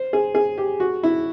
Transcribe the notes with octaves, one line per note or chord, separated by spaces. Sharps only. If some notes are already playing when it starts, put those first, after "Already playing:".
Already playing: C5
G#4
G#4
G4
F#4
E4